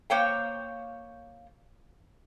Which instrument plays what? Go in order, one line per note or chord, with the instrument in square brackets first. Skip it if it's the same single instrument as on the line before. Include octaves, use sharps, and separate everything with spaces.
[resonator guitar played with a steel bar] A#3 C5 C#5 F5 G5